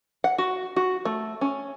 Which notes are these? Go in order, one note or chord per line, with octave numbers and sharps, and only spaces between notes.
F#5
F#4
F#4
A3
C#4